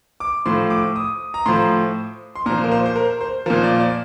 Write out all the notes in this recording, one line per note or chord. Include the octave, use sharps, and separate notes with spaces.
D6
A2 F3 C6
D6
D#6
A#5
A2 F3 C6
C6
A#2 F3 A#5
A#4
C5
C5
A#4
C5
A#2 F3 A#4
D5
D5